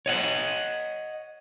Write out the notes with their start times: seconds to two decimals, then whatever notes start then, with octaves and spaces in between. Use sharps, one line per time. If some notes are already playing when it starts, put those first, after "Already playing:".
0.06 C#5 D#5 F#5